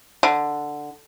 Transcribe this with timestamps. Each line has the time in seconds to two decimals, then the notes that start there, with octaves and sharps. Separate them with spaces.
0.23 D3